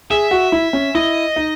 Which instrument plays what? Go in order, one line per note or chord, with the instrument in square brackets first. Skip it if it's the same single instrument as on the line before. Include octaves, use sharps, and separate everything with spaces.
[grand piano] G#4 [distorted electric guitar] E5
[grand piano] F#4
E4
C#4
[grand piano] E4 [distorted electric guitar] D#5
[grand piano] D#4